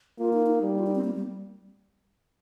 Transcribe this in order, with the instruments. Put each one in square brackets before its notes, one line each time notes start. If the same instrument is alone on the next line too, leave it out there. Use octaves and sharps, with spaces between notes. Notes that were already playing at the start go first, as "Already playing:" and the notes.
[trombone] A#3 [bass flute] F4
[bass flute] D#4
D#4
[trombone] G3
[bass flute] F4
D#4
C4
A#3
G3